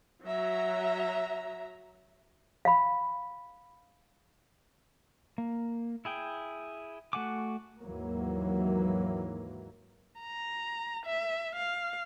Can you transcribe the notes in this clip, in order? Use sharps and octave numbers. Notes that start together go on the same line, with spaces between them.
F#3 E5 A#5
F5 B5
A#3
E4 G#4 G5
A3 F#4 F#5 G#5 D6
D#2 G#2 E3 F#3 A#3
A#5
E5
F5